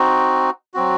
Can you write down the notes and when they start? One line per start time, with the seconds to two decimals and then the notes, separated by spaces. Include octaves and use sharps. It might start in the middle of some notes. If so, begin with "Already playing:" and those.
Already playing: C4 D#4 F#4
0.74 F#3 C4 F#4